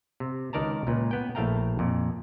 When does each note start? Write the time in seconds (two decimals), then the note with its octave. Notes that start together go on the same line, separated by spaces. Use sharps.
0.20 C3
0.53 C#2 D#3 A#4 D5 A5 A#5
0.87 C#2 A#2 B4
1.11 B3 G5
1.35 A#1 A2 A3 F5 G5 A#5
1.79 F2 A#2